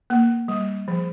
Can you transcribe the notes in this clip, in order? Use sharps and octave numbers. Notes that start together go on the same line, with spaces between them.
A#3
G3
F3